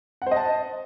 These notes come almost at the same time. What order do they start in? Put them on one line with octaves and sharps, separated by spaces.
F#5 C5 D#5 A5